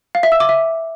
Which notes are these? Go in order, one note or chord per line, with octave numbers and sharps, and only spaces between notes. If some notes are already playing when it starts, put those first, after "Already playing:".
F5
E5
E6
D6
E5